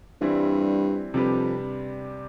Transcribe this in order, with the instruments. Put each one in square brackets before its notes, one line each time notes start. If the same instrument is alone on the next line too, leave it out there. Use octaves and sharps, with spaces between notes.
[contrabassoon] G2 [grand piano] E3 G3 C4 E4
[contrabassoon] F2 [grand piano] C3 G3 D4 G4 B4